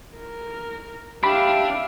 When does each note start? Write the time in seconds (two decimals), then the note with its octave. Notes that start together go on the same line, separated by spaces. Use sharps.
0.16 A#4
1.24 D4 G4 E5 F5 B5